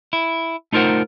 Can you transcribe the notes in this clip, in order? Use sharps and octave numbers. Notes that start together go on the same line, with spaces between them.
E4
A3 D#4 F4 A#4 C5 F#5